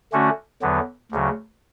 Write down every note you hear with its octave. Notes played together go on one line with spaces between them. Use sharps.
D3 A3 C#4 F#4
E2 D3 F#3 B3
D2 C#3 F#3